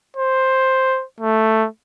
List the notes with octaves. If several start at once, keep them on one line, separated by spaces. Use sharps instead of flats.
C5
A3